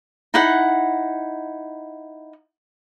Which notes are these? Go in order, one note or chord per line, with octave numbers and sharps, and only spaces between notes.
D#4 E4 F#5